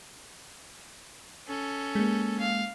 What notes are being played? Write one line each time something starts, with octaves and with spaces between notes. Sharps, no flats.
C#4 A4
G#3 A#3
F5